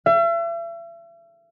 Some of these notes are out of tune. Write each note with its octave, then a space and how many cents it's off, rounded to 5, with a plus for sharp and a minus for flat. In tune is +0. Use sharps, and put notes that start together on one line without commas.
E5 +40